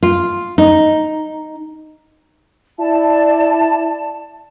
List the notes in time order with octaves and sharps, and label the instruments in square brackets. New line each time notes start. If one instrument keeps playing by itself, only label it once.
[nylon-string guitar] F4
D#4
[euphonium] E4 [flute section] D5 A5